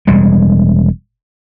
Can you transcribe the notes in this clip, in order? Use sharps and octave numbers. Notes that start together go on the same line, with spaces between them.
E1 G3 G#3